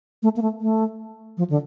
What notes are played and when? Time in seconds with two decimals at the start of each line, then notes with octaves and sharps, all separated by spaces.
0.23 A3
0.37 A#3
0.42 A3
0.61 A3
1.37 F3
1.50 D3